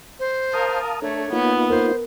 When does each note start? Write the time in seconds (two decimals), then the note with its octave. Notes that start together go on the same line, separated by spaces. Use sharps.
0.19 C5
0.53 A#4 F5 A5 D#6
1.02 A3 D4 A4 C#5
1.33 A#3 B3 D#4 F4
1.70 A#4 C5